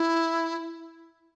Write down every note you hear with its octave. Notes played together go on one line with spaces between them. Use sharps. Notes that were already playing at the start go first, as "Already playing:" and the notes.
Already playing: E4